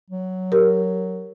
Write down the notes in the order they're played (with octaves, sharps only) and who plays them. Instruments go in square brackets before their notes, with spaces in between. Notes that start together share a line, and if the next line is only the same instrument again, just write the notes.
[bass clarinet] F#3
[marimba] G4 A#4